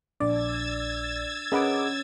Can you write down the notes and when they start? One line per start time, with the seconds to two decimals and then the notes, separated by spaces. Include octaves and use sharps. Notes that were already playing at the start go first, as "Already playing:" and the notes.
0.20 A#1 D4 D5 E6 G#6 A6
1.52 C#4 G#4 A#4 B4 D#5 F#5 D6